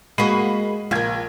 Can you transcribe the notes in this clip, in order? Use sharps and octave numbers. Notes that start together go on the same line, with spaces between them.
G#3 A#3 F#4 B5 C7 D#7
A#1 F4 A#4 G#6